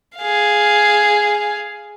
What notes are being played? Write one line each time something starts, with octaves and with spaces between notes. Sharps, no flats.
G#4 F5